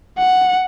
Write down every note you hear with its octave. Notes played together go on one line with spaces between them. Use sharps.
F#5